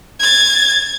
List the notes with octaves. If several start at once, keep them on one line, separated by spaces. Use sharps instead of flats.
G#6 A6